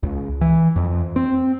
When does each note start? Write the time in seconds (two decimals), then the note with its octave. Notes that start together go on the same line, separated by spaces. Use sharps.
0.03 C#2
0.41 E3
0.76 F2
1.16 C4